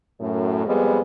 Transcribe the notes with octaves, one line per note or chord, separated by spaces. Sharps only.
F#2 A2
F2 G3 G#3 B3